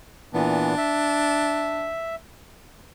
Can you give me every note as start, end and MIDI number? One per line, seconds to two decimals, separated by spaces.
0.34 0.75 46
0.34 0.75 52
0.34 0.75 59
0.34 1.91 62
0.78 2.15 76